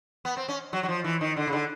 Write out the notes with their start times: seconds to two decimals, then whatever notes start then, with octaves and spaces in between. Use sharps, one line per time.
0.25 B3
0.37 C4
0.48 C#4
0.73 F#3
0.83 F#3
0.88 F3
1.04 E3
1.21 D#3
1.36 D3
1.47 C#3
1.53 D3